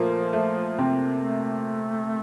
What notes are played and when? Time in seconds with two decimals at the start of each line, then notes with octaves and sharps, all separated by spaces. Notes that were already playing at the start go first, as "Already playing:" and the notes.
Already playing: A#2 F3 A3 A#3
0.33 A3
0.78 C3 C4
1.23 A3